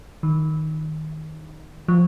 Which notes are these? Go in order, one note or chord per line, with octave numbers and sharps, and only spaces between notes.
D#3
F3